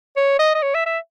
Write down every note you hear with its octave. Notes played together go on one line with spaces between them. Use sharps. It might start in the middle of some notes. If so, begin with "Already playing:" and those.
C#5
D#5
D#5
C#5
E5
E5